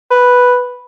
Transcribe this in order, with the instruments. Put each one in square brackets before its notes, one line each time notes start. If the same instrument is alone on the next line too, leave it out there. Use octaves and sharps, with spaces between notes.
[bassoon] B4